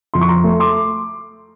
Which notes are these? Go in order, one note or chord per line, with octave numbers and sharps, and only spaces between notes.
F2 C6
C#6
A#5 C6
A3
C6 D6